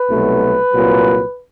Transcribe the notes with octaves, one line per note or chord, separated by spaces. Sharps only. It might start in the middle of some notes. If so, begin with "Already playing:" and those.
Already playing: B4
C2 B2 F#3 A3
C2 A#2 F#3